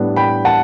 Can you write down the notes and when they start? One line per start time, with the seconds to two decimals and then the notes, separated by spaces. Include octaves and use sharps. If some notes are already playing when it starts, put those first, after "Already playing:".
Already playing: A2 G3 B3 D4
0.16 G5 B5
0.45 F#5 A5